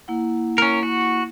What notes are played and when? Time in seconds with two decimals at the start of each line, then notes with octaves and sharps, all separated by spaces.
0.08 A#3 E4 F#5
0.58 C#4 A#4
0.83 F#4